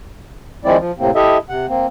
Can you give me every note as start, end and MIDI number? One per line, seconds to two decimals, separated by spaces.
0.65 0.77 51
0.65 0.77 53
0.65 0.77 56
0.65 0.77 60
0.65 0.77 64
0.65 0.77 74
0.79 0.92 53
0.99 1.11 45
0.99 1.11 48
0.99 1.11 58
0.99 1.11 60
1.15 1.37 64
1.15 1.37 67
1.15 1.37 69
1.15 1.37 75
1.15 1.37 76
1.49 1.66 48
1.49 1.66 78
1.68 1.87 58
1.68 1.87 60